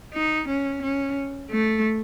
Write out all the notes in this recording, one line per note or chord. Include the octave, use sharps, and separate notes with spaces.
D#4
C#4
C#4
A3